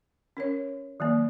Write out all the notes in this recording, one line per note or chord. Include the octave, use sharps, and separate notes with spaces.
C#4 A#4 C#5
D#3 F#3 A#3